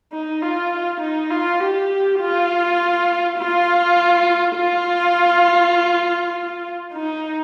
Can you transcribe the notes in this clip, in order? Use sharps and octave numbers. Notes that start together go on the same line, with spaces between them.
D#4
F4
D#4
F4
G4
F4
F4
F4
D#4